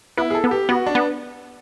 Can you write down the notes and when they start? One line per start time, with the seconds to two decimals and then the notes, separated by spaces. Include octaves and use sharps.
0.17 B3 E4
0.30 G#4
0.35 A4
0.44 B3
0.51 G4
0.69 B3 F#4
0.86 D4
0.95 B3